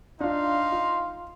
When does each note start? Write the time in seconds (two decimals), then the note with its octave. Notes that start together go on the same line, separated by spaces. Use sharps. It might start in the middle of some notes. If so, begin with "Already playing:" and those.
0.20 D4 D#4 F4 F5 C6
0.72 F4